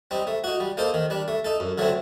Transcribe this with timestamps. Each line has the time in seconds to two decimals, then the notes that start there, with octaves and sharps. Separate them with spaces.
0.11 G3 C4 D#4
0.27 A3
0.44 D#4 F#4
0.60 G3
0.77 A#3 D#4 A4 C5
0.94 D#3
1.10 G3 D4
1.28 A3
1.45 D#4 A4
1.60 F#2
1.78 D3 F#3 A3 C4